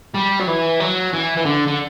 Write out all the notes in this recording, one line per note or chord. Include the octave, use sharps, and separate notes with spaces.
G3
F#3
E3
F#3
E3
E3
D3
D3